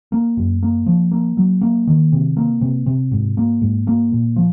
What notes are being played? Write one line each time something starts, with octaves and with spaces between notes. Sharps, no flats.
A#3
F#2
A#3
F3
A#3
F#3
A#3
D#3
C3
A#3
C3
C3
G#2
A#3
G#2
A#3
A#2
F3